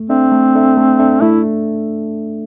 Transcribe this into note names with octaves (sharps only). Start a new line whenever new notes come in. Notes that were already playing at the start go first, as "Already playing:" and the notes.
Already playing: A3
C4 D4 A4 E5
A3
D4 A4 E5
A3
D4 A4 E5
A3 E4